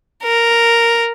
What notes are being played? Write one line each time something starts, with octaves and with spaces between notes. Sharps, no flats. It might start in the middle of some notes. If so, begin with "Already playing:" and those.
A#4